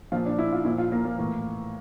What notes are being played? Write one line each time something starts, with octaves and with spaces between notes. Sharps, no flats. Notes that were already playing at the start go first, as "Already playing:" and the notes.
A#2 F3 F4
D4
E4
F4
A#2 F3 E4
F4
A#3
A#3
A2 E3